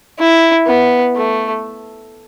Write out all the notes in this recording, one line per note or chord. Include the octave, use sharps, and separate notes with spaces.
E4
B3
A3